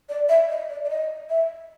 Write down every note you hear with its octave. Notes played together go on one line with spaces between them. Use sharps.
D5
E5
D#5
D5
D5
D#5
E5